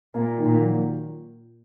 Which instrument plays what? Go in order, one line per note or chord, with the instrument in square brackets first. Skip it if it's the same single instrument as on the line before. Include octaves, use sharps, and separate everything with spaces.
[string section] A#2 [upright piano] A#3
[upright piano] D#3
[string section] A#2
[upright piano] F#3